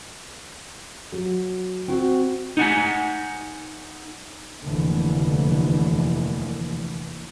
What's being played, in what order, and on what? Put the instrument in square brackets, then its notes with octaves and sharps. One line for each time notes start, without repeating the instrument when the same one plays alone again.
[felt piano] F#3
C4 F#4
[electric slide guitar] D#4 F#5 G#5
[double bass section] F1 D#2 D3 E3